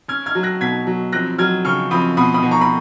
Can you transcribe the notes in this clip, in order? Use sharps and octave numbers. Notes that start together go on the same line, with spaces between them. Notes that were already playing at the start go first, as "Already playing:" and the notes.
C#4 F6 G#6
F6 G#6
F#3
F#6 A#6
B2 G#6 B6
F#3
F2 F#6 A#6
F#3 F6 G#6
C#3 C#6 F6
F2 B5 D#6
B2 B5 D#6
B5 D#6
B2
A#5 C#6
B5